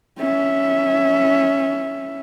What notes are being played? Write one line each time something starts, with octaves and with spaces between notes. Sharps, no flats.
C#4 E5